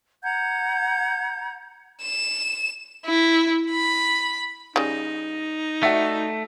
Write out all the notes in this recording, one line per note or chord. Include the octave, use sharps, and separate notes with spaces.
F#5 A#5 G6 G#6
E7
E4
B5
C#3 G3 D#4
A3 F#4 D5 E5